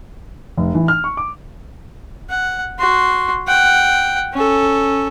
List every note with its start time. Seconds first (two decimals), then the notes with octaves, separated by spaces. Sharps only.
0.58 F1
0.75 E3
0.88 F6
1.04 C#6
1.17 D6
2.30 F#5
2.79 F#4 C6
3.47 F#5 G5
4.33 C#4 A4